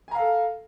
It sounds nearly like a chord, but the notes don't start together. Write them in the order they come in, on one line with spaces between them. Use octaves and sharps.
G#5 A#5 F5 A4